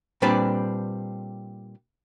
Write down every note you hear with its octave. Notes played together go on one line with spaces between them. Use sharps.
A#2 G3 C4 D4 B4 D5